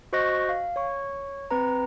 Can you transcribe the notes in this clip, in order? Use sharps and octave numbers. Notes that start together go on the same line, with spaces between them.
F#4 C5 D#5 C#6 F#6 A#6
F5
C#5 C#6
C4 B4 A#5